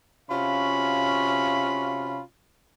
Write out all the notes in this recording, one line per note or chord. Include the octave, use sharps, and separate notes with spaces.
C3 C#4 F4 F#4 F5 B5